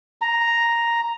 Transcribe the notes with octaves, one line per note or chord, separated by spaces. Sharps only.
A#5